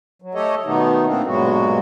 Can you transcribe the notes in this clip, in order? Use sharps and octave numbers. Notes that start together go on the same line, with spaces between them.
F#3
A3 G4 A4 C#5 D#5
B2 D#3 A3 B3 D#4
B2 A3 A#3 C4 D4 F4
G2 A#2 F#3 G#3 B3 F#4